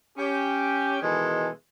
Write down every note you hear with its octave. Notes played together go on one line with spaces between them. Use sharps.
C#4 G4
B2 D#3 E3 G#3 A4 C6